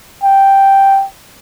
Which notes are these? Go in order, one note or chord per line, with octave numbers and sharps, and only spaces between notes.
G5